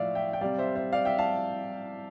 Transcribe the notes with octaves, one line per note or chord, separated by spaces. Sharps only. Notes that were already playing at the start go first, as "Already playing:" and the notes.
Already playing: A2 F3 D5 E5 F5
E5 G5
G5
C3 G3 D5 F5
C5 E5
C5 E5
D5 F5
E5 G5
F5 A5